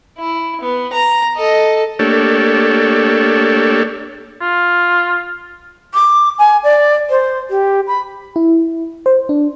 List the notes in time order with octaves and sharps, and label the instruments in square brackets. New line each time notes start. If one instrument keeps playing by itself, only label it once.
[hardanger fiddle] E4
B3
A#5
A4 D#5
[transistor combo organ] A3 A#3 D4 G4 A4 C#5
[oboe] F4
[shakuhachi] D6
G#5
D5
C5
G4
B5
[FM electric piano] E4
C5
D4